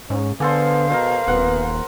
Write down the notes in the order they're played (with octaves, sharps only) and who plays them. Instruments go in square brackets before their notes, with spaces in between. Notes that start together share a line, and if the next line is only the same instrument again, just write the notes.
[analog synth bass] G#2 [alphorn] C#4
[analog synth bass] D3 [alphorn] B3 [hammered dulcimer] G#4 A4 C5 [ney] F5
[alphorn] B2 [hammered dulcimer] A#4 C5
[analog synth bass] D#1 [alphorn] B3 [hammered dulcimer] F#5